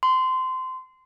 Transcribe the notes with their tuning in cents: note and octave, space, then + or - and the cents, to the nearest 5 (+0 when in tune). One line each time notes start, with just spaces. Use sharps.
C6 -20